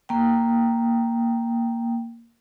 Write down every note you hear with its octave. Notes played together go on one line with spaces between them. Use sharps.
A#3 G5